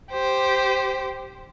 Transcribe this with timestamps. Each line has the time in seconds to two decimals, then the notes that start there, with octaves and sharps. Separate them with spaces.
0.12 G4 C5